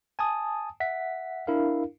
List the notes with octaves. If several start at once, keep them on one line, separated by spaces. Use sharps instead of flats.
G#5 A5 D#6
E5 F#5 B6
D4 E4 A#4 F5